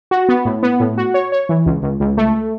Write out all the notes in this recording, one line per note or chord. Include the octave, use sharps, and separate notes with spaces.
F#4
B3
A2
B3
A2
F#4
C#5
C#5
E3
C#2
C#2
C#2
A3